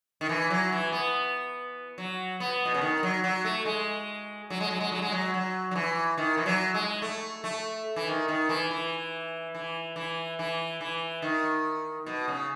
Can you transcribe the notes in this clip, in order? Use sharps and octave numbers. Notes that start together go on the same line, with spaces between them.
D#3
E3
F#3
E3
B3
F#3
B3
B2
C#3
D#3
F#3
F#3
A3
G#3
F#3
G#3
F#3
G#3
F#3
G#3
F#3
F#3
F#3
E3
D#3
E3
F#3
G#3
A3
A3
E3
D#3
D#3
E3
E3
E3
E3
E3
E3
D#3
B2
C#3